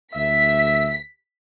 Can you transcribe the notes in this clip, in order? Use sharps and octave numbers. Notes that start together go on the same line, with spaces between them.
D2 E5 B6